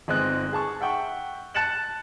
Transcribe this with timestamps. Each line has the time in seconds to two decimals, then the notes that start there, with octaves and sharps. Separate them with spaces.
0.08 G1 G#3 C4 D#4 F#6
0.53 G#4 A5 C#6
0.81 E5 F#5 G5 C#6
1.54 A5 F#6 A6 C#7 E7 F#7